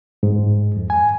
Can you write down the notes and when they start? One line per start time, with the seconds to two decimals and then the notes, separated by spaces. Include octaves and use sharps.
0.23 G#2
0.77 F2
0.90 G#5